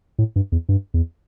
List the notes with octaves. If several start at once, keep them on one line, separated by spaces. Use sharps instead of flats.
A2
G2
E2
G2
E2